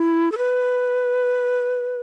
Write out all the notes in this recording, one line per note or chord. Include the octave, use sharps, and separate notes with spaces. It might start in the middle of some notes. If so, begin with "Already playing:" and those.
Already playing: E4
A4
B4